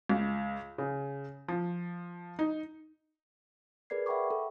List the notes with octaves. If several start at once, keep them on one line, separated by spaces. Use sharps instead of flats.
C#2
C#3
F3
D#4
G#4 A#4 B4 D5 G#6 C7
E5 F#5 G5 B5 C#6 D6
A4